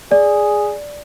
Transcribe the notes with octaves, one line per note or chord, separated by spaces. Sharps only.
G#4 D5